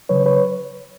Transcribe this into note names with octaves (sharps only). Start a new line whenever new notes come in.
C#3 F#3 B4 C#5
B4 C#5